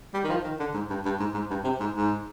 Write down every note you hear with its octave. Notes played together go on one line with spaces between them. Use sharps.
G3
D#3
F3
D#3
D3
G#2
G2
G2
G#2
G#2
G2
C3
G#2
G#2